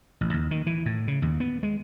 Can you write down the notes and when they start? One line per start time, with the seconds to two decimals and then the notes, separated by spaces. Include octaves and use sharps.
0.21 A1
0.34 D#2
0.51 D#3
0.66 E3
0.86 A2
1.08 C#3
1.22 D#2
1.40 B3
1.63 G#3